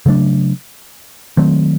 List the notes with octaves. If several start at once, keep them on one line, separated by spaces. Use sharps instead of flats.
C#3 F#3 A3 D4
D#3 F#3 A3 C4